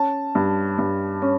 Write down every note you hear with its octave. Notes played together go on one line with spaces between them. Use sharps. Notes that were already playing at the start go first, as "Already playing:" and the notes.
Already playing: C#4 A5
G2
G2
C#4